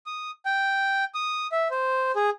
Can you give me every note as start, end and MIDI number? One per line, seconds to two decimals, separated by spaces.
0.06 0.31 87
0.46 1.04 79
1.15 1.47 87
1.52 1.68 76
1.71 2.12 72
2.16 2.30 68